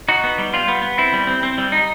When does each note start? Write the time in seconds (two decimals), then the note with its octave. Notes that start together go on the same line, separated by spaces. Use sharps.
0.08 D#4 F#4
0.24 B3
0.38 G3
0.53 G3 F4
0.68 B3
0.82 B3
0.98 C4 E4
1.13 G3
1.27 C4
1.43 C4
1.58 G3
1.72 D#4